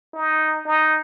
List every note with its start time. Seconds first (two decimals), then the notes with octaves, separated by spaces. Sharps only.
0.14 D#4
0.65 D#4